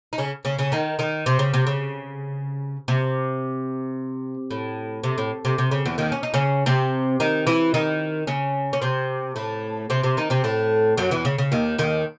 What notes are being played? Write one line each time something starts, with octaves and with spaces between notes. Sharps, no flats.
D#4
C#3 C#4
C#3 C#4
C#3 C#4
D#3 D#4
D#3 D#4
C3 C4
C#3
C3
C#3
C3
A2
C3
A2
C3
C3
C#3
E2 E3
D#2 D#3
C#4
D#4
C#3 C#4
C3 C4
D#3 D#4
E3 E4
D#3 D#4
C#3 C#4
C#4
C3 C4
A2 A3
C3 C4
C3 C4
D#3 D#4
C3 C4
A2 A3
F#2 F#3
E2 E3
C#3
C#3
D#2 D#3
D#2 D#3